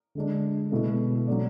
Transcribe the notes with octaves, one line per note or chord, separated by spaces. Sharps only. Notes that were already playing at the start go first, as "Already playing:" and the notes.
D3 G#3 D4
B2 G#3 B3 E4 A4
F#3 B3 D4 A4 D5